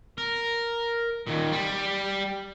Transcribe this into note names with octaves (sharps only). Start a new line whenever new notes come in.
A#4
D#2 A#2
G3